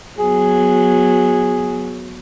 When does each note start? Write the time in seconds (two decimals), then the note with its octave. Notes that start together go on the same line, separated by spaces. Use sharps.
0.19 F#3 B3 G#4